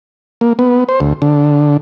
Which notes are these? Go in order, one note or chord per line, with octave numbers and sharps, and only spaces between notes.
A#3
B3
C5
D2
D3